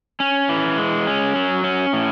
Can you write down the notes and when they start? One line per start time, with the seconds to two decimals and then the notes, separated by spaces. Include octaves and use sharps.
0.20 C#4
0.49 E3
0.78 G#3
1.07 C#4
1.36 F#3
1.64 C#4
1.93 A2